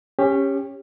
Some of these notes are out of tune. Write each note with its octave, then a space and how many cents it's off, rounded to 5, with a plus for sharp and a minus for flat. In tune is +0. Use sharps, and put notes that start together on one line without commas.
C#4 -10 G4 +20